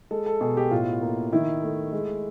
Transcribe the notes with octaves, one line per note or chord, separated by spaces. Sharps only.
G#3 A4
A4
B2 G#4
G4
A2 F4
A#3
D#3 E4
A3
G#3